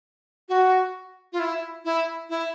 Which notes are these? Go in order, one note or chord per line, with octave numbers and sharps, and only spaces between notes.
F#4
F4
E4
E4
E4